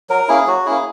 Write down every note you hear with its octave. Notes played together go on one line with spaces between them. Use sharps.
F#3 A#4
A#3 C#4 E4 G#4
F#3 F#4
A#3 C#4 E4 G#4